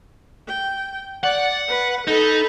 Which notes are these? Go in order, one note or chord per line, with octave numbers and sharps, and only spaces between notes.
G5
D5 F#5
B4
D#4 A4 B5